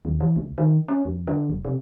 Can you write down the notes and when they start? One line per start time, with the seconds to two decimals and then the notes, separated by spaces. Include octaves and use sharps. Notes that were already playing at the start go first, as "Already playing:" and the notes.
0.05 D#2
0.20 E3
0.36 C#2
0.58 D#3
0.88 C#4
1.05 F2
1.27 D3
1.50 F1
1.65 C3